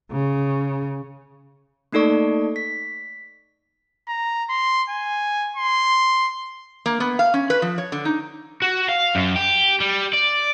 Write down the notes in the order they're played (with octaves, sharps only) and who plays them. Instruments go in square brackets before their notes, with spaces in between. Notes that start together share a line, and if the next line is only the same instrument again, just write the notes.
[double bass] C#3
[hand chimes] A3 A#3 D#4 A4 D5 C#6
B6
[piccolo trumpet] A#5
C6
G#5
C6
[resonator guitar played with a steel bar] A#3
B3
F5
C#4
B4
F3
C#5
D3
D#4
[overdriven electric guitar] F#4
F5
F#2
G4
G3
D5